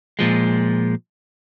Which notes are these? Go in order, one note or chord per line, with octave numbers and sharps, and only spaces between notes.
A#2 F3 G#3